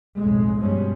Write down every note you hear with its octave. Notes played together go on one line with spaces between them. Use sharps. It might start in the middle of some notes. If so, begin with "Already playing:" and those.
B1 F2 A2 G#3
G2 B2 F3 G3 G#3 C#4